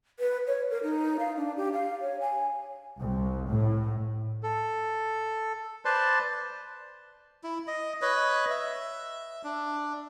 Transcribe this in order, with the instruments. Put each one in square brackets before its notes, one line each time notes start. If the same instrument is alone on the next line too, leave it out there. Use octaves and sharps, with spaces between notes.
[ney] B4
C#5
A#4
D#4
F5
D4
G4
F5
C#5
G#5
[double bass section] C2
A2
[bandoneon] A4
B4 C5 D5 A5 C6
[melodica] E4
D#5
B4 C#5 D#5
E5
D4